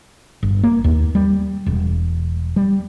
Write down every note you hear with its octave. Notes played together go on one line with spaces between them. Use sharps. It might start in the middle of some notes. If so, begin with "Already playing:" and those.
G1
A#3
D#2
G3
E1
G3